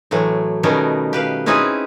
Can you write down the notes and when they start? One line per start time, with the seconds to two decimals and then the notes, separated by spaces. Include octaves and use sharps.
0.11 A2 E3 F#3 A3
0.63 B2 D#3 G3 A3 B3 C#4
1.13 G4 B4 F5
1.46 C4 C#4 D#4 E4 G#4 B4